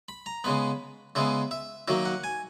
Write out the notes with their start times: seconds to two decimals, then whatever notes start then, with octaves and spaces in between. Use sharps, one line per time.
0.09 B5
0.26 A#5
0.44 C#3 G#3 B3 B5
1.15 C#3 G#3 B3 E5
1.51 E5
1.88 D#3 F#3 A#3 E5
2.05 F#5
2.24 G#5